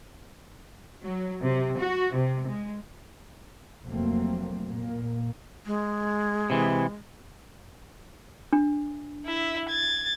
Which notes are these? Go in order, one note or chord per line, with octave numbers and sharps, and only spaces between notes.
F#3
C3
F#4
C3
G#3
F1 C2 F#3 A3 A#3 C4
A#2 A#3
G#3
C3 E3
D4
E4 E5
G#6 A6